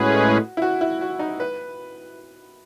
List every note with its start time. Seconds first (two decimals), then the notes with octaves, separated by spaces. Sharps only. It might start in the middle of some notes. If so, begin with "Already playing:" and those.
Already playing: A2 G#3 C#4 F#4 G#4 B4
0.57 E4
0.62 F#4
0.81 E4
1.01 F#4
1.19 D#4
1.40 B4